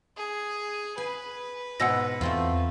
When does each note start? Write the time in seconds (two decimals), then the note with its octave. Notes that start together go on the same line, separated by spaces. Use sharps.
0.17 G#4
0.98 B4 G#5
1.80 G#2 B2 G#3 F#5 E6 A#6
2.21 E2 A3 C4 F4